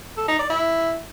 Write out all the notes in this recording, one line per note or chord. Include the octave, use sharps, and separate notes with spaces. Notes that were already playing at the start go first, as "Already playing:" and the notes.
A4
D#4
D5
E4